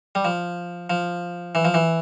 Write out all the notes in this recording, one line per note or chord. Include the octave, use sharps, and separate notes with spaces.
G3
F3
F3
E3
F3
E3